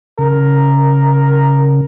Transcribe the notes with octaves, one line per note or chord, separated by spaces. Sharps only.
C#3 A#4